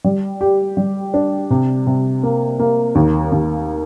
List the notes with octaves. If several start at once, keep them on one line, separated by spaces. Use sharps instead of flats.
G3
G4
G3
D4
C3
C3
A#3
A#3
D#2
D#2